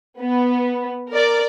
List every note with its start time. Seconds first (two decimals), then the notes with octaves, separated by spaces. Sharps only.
0.19 B3
1.11 A#4 D5